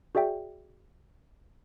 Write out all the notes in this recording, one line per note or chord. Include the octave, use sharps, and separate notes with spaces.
F#4 G#4 D5 E5 G5